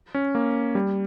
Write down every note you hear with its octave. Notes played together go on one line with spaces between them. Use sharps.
C#4
A#3
G3